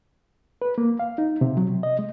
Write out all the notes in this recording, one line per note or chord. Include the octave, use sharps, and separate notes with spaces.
B4
A#3
F5
D#4
C3
F#3
C3
D#5
G#3